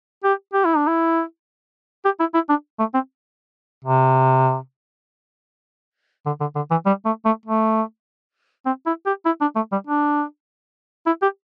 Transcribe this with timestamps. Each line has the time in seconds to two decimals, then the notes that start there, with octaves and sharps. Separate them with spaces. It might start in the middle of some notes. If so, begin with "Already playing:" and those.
0.24 G4
0.53 G4
0.65 E4
0.76 D4
0.87 E4
2.05 G4
2.20 E4
2.34 E4
2.49 D4
2.79 A3
2.94 C4
3.84 C3
6.26 D3
6.40 D3
6.55 D3
6.71 E3
6.86 G3
7.05 A3
7.25 A3
7.46 A3
8.65 C4
8.86 E4
9.06 G4
9.25 E4
9.41 D4
9.56 A3
9.72 G3
9.87 D4
11.06 E4
11.22 G4